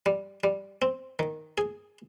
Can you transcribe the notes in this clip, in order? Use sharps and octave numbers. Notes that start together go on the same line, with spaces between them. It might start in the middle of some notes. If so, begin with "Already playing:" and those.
G3
G3
C4
D#3
G#4